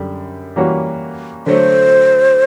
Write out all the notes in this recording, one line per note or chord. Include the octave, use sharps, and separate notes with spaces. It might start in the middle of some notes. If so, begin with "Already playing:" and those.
Already playing: F#2 D3 G3
E3 G3 A#3 C#4 F#4
D3 F#3 A3 C5